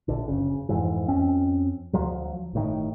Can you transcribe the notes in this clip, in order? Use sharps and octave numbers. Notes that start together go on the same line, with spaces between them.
A#1 D3
F#1 C#3
F2 G#2 E3
F2 C4 C#4
D2 F3 F#3
G1 A2 D#3